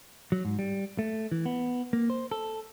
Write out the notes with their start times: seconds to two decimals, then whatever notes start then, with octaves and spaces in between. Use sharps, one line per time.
0.32 F#3
0.45 G#2
0.59 G3
0.99 A3
1.32 E3
1.46 B3
1.93 A#3
2.10 C5
2.31 A4